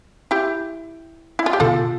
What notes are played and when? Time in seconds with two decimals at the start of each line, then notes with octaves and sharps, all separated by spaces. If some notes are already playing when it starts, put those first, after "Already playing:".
0.31 E4 G4
1.39 E4
1.46 F4
1.53 G4
1.60 B2 D3 F4 A4